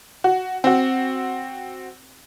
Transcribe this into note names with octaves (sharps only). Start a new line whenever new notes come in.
F#4
C4 F#4